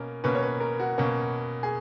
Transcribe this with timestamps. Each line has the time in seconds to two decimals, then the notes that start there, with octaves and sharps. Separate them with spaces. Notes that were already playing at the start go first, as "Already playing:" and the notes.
Already playing: B2 A#3 C#4 A#4
0.24 B2 A#3 C#4 B4
0.35 C#5
0.42 B4
0.60 A#4
0.79 F#4
0.98 B2 A#3 C#4
1.63 G#4